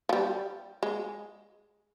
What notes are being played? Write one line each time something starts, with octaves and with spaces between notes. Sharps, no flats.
F3
G3
G#3